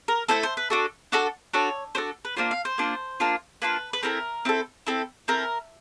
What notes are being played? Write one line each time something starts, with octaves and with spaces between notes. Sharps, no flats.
A#4
A3 C#4 E4 A4 C5
C5
B4
D4 F#4 A4
D4 F#4 A4
D4 F#4 A4 C#5
D4 F#4 A4 C5
B4
A#3 D4 F4 C5
F5
C5
A#3 D4 F4
A#3 D4 F4
A#3 D4 F4 B4
B4
C4 E4 A4 A#4
C4 E4 A4
C4 E4 A4
C4 E4 A4 A#4